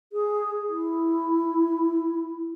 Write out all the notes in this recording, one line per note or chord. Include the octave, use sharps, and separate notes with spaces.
G#4
E4